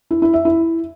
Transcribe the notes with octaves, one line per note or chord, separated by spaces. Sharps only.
E4
E4
E5
E4